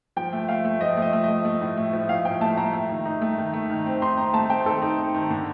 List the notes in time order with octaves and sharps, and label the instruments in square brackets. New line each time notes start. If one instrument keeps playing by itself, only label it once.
[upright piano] F3 G5
A3
A3 F5
A3
F3 D#5
A3
D#5
A3
D#5
A3
A3
A2
A3
F3
A2 F5
F3 G5
A3 A5
A3 A#5
A3
D#3
D#4
A3
D#3
A3
D#3
C4
D#4 C6
C4 A#5
A3 A5
C4 G5
D#3 A4
D#4
C4
D#3
D3